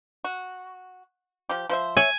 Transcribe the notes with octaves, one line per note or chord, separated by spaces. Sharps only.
F#4
F3 G4
F3 C5 E5
C#5 E5 G#5